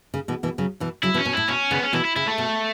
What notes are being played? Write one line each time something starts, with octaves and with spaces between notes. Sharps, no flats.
C#3
B2 E3
B2 E3
C#3 F#3
B2 E3
C#3 F#3 E4
B2 E3
C#4
B2
A2 E4
B2 C#4
C#3 B3
C#4
B2 E3 E4
E4
C#3 E4
A3
B2